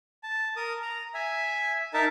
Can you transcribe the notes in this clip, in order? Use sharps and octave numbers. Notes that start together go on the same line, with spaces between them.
A5
A#4 D#6
A#5
E5 G#5
D#4 A#4 E5 A5